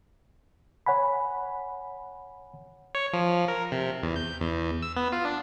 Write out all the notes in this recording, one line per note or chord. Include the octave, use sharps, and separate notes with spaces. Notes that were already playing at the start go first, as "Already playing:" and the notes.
C#5 F#5 G#5 B5
C#5
F3
A#4
C3
E2
G6
E2
E6
B3
F4
D4